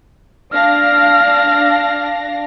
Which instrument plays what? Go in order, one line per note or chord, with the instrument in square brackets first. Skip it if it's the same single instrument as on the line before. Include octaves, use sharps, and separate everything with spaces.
[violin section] D4 F5 A#6 [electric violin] F6